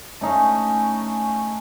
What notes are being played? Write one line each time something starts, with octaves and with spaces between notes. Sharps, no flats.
A3 C#4 D#4 F5